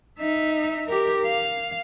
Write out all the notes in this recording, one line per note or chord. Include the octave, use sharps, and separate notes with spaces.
D#4 E5
G4 A#4
F5